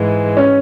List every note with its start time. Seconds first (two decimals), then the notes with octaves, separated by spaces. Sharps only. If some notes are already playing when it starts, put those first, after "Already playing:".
Already playing: G#2 E3 G#3
0.37 C#4